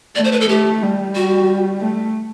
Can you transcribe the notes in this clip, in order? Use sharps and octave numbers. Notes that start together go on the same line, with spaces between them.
A3 D5
C5
B4
A4
A3 G4
G3
F#4
A3